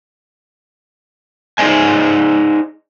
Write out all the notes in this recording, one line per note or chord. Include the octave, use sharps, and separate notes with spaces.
D#4 G#4 C5 D5 D#5 G#5